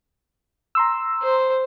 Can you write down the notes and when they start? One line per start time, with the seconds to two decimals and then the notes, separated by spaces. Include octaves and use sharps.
0.75 A#5 C6 E6
1.22 C5